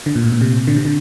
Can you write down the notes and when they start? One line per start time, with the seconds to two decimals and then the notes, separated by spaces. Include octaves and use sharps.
0.06 D3
0.15 A#2
0.24 A2
0.32 A#2
0.41 C3
0.67 D3
0.76 C3
0.85 D3